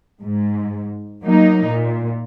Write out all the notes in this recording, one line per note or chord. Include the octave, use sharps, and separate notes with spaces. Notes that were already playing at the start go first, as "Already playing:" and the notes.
G#2
F#3 A#3 D#4
A#2